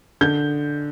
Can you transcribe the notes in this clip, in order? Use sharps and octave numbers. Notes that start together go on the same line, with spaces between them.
D3 G6